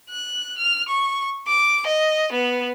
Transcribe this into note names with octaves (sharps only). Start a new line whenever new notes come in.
F#6
F6
C#6
D6
D#5
B3